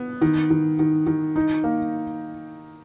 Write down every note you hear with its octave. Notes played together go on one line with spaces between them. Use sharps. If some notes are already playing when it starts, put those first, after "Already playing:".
Already playing: B3
D#3
D#3
D#3
D#3
D#4
A#3